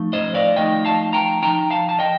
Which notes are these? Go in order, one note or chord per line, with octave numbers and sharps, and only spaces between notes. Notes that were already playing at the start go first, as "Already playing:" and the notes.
Already playing: F3 A3 D#4
C5 D#5
D5 F5
F3 A3 D#4 D#5 G5
F5 A5
G5 A#5
F3 C4 D#4 G5 A#5
F5 A5
A5
D#5 G5